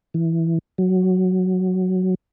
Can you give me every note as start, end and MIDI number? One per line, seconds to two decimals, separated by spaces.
0.14 0.58 52
0.78 2.14 54